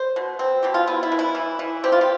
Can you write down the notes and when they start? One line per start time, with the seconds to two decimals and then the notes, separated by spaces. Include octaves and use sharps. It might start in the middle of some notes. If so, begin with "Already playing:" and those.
Already playing: C5
0.16 B2
0.39 C4
0.63 B2 G4
0.74 F4
0.87 B3 E4
1.03 E4
1.12 E3
1.19 E4
1.35 E3
1.59 E3
1.84 C4 G4
1.92 F4
2.01 G4